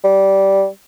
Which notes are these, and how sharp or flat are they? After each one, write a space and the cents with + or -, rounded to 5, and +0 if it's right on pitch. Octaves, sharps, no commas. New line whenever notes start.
G3 -10